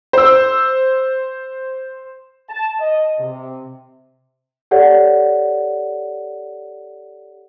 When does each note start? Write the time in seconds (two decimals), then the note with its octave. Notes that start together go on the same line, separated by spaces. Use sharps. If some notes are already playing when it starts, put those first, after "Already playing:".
0.13 C5 E6
2.49 A5
2.80 D#5
3.19 C3
4.71 G4 A4 C#5 D5 F#5